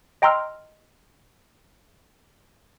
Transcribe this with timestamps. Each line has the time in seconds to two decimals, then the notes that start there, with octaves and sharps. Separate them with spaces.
0.22 D#5 G5 A#5 C6 E6 F6